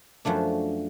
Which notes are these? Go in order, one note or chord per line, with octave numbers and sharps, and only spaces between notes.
F#2 F3 A3 D4